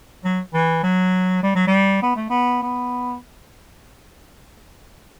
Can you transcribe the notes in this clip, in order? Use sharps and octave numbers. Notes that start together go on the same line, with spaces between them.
F#3
E3
F#3
G3
F#3
G3
B3
A3
B3
B3